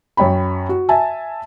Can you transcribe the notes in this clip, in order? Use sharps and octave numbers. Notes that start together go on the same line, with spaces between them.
F#2 C#5 G5 B5
F#4
E5 G#5 A5